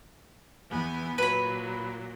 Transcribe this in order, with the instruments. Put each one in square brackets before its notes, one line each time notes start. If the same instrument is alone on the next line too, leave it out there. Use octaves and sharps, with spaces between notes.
[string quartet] E2 B3 G#5
[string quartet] A#2 F#3 [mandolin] B4 B5